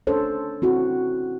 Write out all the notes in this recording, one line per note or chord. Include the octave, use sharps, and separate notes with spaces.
C#4 D4 A4 C5 C#5
C4 E4 F#4